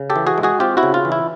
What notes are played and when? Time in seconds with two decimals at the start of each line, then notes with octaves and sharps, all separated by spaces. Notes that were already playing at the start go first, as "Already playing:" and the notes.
Already playing: C#3
0.10 G4 A4
0.16 E3
0.27 F#4 G#4
0.38 G#3
0.43 F#4 G#4
0.60 C4 F4 G4
0.77 E4 F#4
0.83 C#3
0.94 F4
1.05 E3
1.12 E4